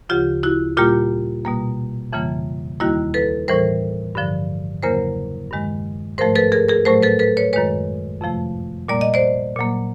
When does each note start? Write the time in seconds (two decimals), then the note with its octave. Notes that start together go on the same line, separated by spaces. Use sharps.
0.09 D2 C#3 F3 F4 G4
0.43 E4 F#4
0.77 A#2 G3 A#3 F4 G4
1.45 B2 G3 A#3
2.13 F2 C#3 E3 G3 A#3
2.80 D#2 D#3 G3 A#3 E4 F#4
3.14 A4 B4
3.48 A2 E3 G3 A#4 C5
4.15 G2 D3 F3
4.83 E2 C#3 F#3 A#3 A#4 C5
5.51 G2 D#3 G#3
6.18 G#2 F3 A3 A#4 C5
6.36 A4 B4
6.52 G#4 A#4
6.68 G#4 A#4
6.85 A2 F#3 A3 A#4 C5
7.03 A4 B4
7.19 A4 B4
7.37 B4 C#5
7.53 F#2 D#3 G#3 B4 C#5
8.21 F2 C3 F3 A3
8.88 A#2 G3 A#3 D5
9.01 D#5
9.14 C5 D5
9.56 A#2 F#3 A#3